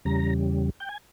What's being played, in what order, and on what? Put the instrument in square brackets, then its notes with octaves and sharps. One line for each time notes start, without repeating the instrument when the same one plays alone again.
[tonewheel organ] E2 C#3 G3 A#5
G5
G#5